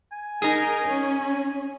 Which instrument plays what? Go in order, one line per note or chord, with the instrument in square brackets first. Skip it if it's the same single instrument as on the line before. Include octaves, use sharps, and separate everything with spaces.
[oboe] G#5
[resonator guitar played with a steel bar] D#4 G#4 [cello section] A#4
[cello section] C#4